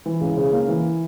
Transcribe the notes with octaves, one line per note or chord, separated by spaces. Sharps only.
E3
C#2
C#3
A#3
E3